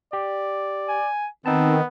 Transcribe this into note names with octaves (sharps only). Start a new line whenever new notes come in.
G4 D5
G#5
D#3 B3 C4 D#4 A5